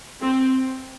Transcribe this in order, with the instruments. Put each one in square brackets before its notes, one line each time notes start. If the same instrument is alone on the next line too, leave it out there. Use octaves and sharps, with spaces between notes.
[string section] C4